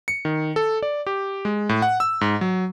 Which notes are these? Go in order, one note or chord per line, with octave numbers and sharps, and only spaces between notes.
C#7
D#3
A4
D5
G4
G#3
A2
F#5
E6
G#2
F#3